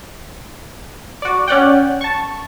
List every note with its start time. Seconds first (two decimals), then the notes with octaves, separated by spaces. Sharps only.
1.22 F#4 D5
1.47 C#4 D5 F#5 G5
2.01 A5 C#6